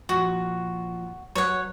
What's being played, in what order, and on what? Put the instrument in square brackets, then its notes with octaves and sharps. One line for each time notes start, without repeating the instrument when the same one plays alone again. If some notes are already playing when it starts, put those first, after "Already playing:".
[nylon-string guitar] A#2 F3 [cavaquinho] F#4
[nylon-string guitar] F#3 B4 [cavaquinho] C#5 F#5